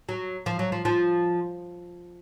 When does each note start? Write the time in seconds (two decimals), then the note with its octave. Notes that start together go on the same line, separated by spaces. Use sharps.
0.09 F#3
0.46 F3
0.59 F#3
0.72 F3
0.85 F3